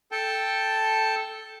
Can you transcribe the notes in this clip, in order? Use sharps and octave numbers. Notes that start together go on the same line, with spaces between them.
A4 G5 A5